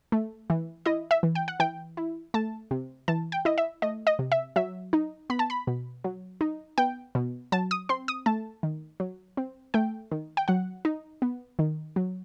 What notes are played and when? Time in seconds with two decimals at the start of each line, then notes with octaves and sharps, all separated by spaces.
0.12 A3
0.50 E3
0.86 E4 D#5
1.11 E5
1.23 E3
1.35 G5
1.48 F#5
1.60 E3 G5
1.97 E4
2.34 A3 A5
2.71 C3
3.08 E3 A5
3.32 G5
3.45 E4 D#5
3.58 E5
3.82 A3 D#5
4.07 D#5
4.19 C3
4.32 E5
4.56 F#3 E5
4.93 D#4
5.30 B3 B5
5.39 A5
5.50 B5
5.67 B2
6.04 F#3
6.41 D#4
6.78 B3 G5
7.15 B2
7.52 F#3 A5
7.71 D#6
7.89 C4 C6
8.08 D#6
8.26 A3 A5
8.63 D#3
9.00 F#3
9.37 C4
9.74 A3 G5
10.11 D#3
10.37 G5
10.48 F#3 F#5
10.85 D#4
11.22 B3
11.59 D#3
11.96 F#3